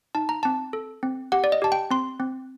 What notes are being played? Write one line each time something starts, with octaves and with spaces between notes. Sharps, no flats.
D#4 A5
A#5
C4 A5
A4
C4
G4 F#5
D5
D#5
G4 A5
G5
C4 C6
C4